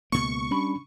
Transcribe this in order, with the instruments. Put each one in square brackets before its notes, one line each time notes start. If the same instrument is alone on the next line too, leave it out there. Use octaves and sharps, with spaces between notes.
[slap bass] C#2 B2 A#3 [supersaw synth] C#6
[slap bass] G3 [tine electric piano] C#4 D4 B5